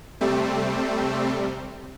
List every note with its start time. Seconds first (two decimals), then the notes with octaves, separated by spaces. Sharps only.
0.21 C3 G3 A3 C4